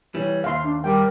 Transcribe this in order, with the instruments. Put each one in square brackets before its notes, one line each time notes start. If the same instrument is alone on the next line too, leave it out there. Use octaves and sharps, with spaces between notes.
[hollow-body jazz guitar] E3 G3 [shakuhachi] C#5
[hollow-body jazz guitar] D#2 [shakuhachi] E5 [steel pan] F5 C6
[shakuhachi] D4
[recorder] G3 [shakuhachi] A#4 [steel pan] G5